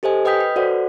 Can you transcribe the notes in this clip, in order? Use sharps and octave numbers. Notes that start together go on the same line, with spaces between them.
G4 A4 C5 D#5 G#5
B4 D#5 G5 D#6 G6 B6
B4
F#4 A4 C5 D5 F#5